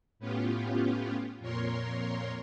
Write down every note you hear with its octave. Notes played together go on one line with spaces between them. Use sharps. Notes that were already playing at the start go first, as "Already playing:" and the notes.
A2 B3 C#4 F4 G4
F2 A#2 A#4 C#5 C6